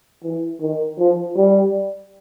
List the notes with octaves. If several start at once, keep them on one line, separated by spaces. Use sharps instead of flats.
E3
D#3
F3
G3